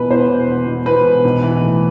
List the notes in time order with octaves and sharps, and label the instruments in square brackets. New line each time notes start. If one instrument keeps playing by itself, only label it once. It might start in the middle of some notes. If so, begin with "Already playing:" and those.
Already playing: [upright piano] E1 B2 B4
E2 C5
E1
E1
B2
E2 B4
E1
B1
E3
A2